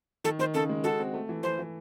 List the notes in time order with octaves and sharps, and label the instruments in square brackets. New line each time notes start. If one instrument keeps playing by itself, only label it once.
[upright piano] D#3 [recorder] A4
[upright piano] D#3 [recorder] C5
[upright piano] C#3 [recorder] A4
[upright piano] G#3
[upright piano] F#4 [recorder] A4
[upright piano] C4
A3
E3
[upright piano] E3 [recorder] C5
[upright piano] E3